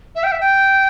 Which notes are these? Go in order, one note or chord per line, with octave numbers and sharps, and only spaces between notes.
E5
G5
E5
G5